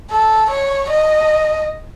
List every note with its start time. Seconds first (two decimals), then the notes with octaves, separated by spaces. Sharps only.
0.10 A4
0.51 C#5
0.90 D#5